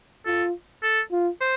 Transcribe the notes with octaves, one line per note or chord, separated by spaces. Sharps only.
F4 A4
A4
F4
C5